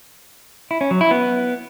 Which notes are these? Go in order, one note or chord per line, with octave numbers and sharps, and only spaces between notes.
E4
C#4
F#3
E4
B3